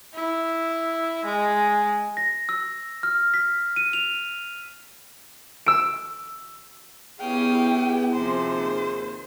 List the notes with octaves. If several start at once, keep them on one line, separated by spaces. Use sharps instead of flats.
E4
G#3
A#6
E6
F6
B6
D#7
F7
E6 D7
B3 C#4 E4 G4 G#4 F5 G5 D#6
D#2 C3 F3 C5